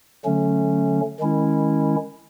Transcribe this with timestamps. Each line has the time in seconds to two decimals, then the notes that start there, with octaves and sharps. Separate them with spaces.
0.25 D3 F#3 A3 C#4
1.20 D#3 G#3 C#4 E4